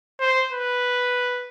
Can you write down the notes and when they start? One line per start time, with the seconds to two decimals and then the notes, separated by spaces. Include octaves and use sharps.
0.20 C5
0.52 B4